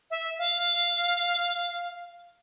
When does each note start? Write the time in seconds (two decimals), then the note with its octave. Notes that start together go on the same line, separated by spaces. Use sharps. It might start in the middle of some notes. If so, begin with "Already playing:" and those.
0.11 E5
0.38 F5